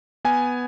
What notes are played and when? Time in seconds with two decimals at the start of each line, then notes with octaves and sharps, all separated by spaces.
0.25 B3 G#5